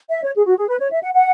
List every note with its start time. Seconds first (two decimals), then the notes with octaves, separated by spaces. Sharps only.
0.09 E5
0.23 C#5
0.35 G#4
0.46 F#4
0.58 G#4
0.68 B4
0.80 C#5
0.91 E5
1.03 F#5
1.14 F#5